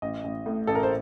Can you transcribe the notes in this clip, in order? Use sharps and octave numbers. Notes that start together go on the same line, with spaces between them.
A1 D#5
A1
A2
A1 A4
A#4
C5